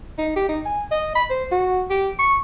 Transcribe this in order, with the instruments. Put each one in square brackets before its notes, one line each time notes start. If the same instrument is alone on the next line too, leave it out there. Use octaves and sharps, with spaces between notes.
[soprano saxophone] D#4
G4
D#4
G#5
D#5
B5
C5
F#4
G4
C#6